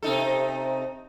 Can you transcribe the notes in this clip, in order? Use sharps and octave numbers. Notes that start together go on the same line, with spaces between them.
C3 D#4 A4